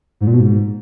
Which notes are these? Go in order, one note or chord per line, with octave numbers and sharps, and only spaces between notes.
G#2
A#2
B2
G#2